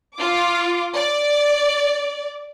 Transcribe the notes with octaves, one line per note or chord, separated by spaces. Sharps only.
F4 D6
D5